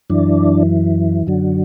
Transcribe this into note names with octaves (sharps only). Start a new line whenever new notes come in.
F#2 E3 D4
F#2 D3 F#3